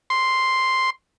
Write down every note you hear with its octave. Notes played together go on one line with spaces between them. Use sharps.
C6